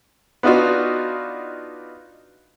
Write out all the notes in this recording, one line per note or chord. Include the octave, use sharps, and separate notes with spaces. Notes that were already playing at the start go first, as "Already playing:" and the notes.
B3 D4 D#4 F4 F#4